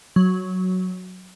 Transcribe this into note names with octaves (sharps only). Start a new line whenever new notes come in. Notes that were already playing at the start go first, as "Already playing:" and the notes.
F#3